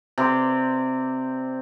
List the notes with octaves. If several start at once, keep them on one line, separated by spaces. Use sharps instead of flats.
C3 C4 D5 C6